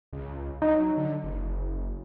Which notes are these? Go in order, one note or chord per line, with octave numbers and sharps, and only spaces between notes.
C#2
F#3 D#4
D3
F#1